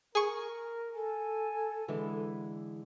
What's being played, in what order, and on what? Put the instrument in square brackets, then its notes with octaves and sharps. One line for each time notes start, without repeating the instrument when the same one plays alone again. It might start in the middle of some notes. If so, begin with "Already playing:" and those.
[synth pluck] G#4 C#6 [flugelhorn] A#4
[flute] A4 [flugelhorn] G#5
[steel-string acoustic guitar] D3 E3 G#3 [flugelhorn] B4